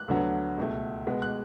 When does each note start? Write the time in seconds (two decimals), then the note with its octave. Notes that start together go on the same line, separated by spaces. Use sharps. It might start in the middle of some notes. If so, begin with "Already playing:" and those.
Already playing: F#6
0.08 D2 D3 F#3 B3
0.58 C#2 B2 A3
1.07 B2 G#3 B3
1.22 F#6